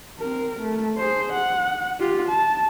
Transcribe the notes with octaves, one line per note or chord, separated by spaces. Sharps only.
C4 A#4
A3
G#4 C5
F#5
F4 G4
A5